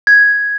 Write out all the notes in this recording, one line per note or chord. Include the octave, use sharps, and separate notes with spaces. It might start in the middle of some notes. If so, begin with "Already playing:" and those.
G#6